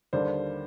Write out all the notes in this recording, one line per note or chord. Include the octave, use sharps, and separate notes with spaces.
D#2 D3 G3 D4 C5